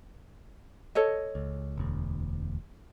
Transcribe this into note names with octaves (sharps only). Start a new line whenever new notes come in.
A4 C#5 D#5
C#2
E1 D2